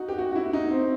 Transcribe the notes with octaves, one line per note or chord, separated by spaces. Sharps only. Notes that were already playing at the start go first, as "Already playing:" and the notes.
Already playing: D#4 F#4
G4
F#4
F#4
E4
D#4
C4